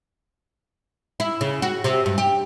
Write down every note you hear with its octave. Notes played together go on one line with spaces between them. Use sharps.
E4
C#3
F#4
C3
G2
G4